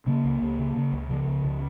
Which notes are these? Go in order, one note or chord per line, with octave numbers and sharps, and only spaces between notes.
C#3 A#3
C#2
C#2
C#3
C#3
C#2
C#3 F3
C#2
C#2